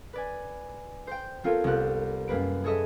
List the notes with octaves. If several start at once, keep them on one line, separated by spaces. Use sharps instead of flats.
B4 D5 G#5
C5 G5
B3 C4 F4 A4 A#4 C#5
C2 A#3 B3 G4 F#6
F#2 G3 A#3 B4 D7
G#4 A4 C#5 D#5 E5